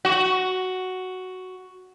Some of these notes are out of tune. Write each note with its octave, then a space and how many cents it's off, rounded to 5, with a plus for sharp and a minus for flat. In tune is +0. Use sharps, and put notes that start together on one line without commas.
F#4 +5